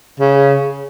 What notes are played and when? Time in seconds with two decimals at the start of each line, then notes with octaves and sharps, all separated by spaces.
0.20 C#3